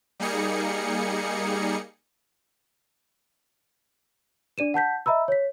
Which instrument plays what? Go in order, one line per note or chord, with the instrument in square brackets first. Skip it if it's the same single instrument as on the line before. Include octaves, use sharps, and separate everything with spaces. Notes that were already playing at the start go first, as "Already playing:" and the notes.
[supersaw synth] G3 A#3 D#4 G#4 C#7
[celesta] D4 D5 D#7 E7
F#5 A5 G6 B6
D#5 E5 A#5 B5 E6
C#5 B6